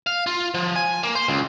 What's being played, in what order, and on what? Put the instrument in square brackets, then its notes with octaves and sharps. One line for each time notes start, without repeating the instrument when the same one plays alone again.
[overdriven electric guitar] F5
F4
F3
G#5
A#3
C5
C#2